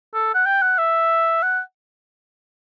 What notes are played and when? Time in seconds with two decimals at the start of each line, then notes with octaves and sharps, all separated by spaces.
0.14 A4
0.34 F#5
0.46 G5
0.62 F#5
0.78 E5
1.43 F#5